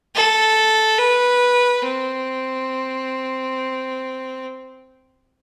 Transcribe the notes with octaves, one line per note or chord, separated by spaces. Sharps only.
A4
B4
C4